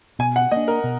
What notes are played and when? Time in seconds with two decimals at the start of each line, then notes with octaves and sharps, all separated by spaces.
0.19 B2 G#5
0.36 F#5
0.51 A#3 D4 D#5
0.68 A#4
0.84 B2